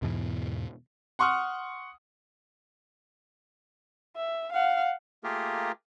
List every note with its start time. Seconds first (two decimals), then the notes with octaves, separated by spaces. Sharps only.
0.02 E2 G#2 B2 E3
1.19 F#5 C6 C#6 D#6 F6
4.16 E5
4.53 F5 F#5
5.24 A3 A#3 F4 G4 G#4 A#4